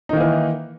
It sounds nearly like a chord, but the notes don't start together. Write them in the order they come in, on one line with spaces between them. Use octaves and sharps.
D#4 D#3 A#3 E3